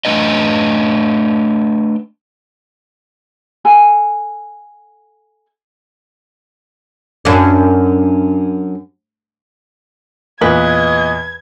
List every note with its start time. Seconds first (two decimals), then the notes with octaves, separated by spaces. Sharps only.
0.05 A3 D4 B4 D#5
3.65 A4 F#5 G#5 B5
7.25 F#2 D4
10.41 E2 A#2 B4 D#5 G#6